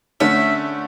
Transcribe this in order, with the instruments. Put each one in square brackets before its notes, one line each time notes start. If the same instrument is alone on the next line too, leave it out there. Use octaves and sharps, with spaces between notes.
[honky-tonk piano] D3 A3 C#4 [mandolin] E5